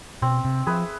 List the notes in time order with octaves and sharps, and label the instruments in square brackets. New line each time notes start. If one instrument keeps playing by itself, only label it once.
[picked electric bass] B2 [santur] C4
[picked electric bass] C3
[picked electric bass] F3 [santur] G#4 B4 E5